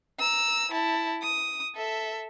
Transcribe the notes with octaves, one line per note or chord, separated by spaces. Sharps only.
A#5 E6
E4 A5
D#6
A4 E5